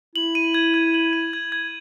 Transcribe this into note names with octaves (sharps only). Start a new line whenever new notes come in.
E4 F#7
D#7
G#6
G#6
F#7
D#7
G#6
G#6